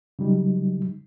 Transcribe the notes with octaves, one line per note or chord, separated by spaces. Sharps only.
C#3 F#3 G3 D#4